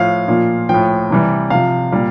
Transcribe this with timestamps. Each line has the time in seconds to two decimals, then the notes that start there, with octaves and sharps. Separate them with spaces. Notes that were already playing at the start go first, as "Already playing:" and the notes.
Already playing: A2 F3 F5
0.28 A#2 F3
0.69 A2 F3 G5
1.10 C3 E3 G3
1.50 C3 F3 F5
1.92 A#2 G3